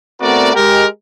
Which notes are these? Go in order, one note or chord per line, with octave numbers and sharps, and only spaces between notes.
A3 B3 C4 F#4 A#4 D5
G#3 G4 A#4